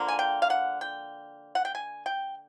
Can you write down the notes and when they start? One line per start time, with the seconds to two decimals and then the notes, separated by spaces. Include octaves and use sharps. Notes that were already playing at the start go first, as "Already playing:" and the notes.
Already playing: D3 F3 A#3
0.08 G#5
0.19 G5
0.42 F5
0.50 F#5
0.81 G5
1.55 F#5
1.65 G5
1.75 G#5
2.06 G5